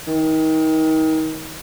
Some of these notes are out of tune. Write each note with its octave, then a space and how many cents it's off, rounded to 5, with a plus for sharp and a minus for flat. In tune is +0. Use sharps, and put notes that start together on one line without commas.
D#3 +30